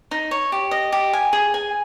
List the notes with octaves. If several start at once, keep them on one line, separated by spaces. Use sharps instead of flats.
D#4
C#5
G4
D#5
G4
G#5
G#4
G#5